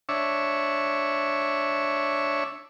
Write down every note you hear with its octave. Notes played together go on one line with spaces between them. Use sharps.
D4 C#5 E5